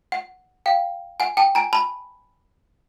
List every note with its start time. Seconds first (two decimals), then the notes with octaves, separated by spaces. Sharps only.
0.12 F#5
0.66 F5 G5
1.20 F#5 G#5
1.37 G5 A5
1.55 G#5 A#5
1.73 A5 B5